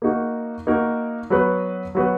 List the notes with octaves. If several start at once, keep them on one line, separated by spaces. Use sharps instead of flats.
A#3 D#4 F#4 A#4
A#3 D#4 F#4 A#4
F#3 B3 F#4 B4
F#3 B3 F#4 B4